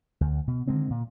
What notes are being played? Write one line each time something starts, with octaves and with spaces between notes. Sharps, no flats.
D2
B2
D3 D#3 G#3 C4
A#2